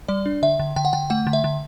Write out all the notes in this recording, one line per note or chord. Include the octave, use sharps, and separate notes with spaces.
G3 D5
D4
D3 E5
D3
D3 G5
F#5
D3 G5
A3 F#5
D3
E5
D3